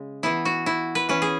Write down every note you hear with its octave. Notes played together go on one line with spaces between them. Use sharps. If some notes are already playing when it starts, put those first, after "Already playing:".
Already playing: C#3 G#3
E3 B3 E4
F#4
E4
B4
E3 C#4 B4
G#4